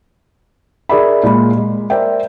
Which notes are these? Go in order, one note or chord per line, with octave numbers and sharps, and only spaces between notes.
D#4 G#4 A#4 D5 E5 B5
A#2 G#3 B5
G#3
A#4 C5 D5 E5 G5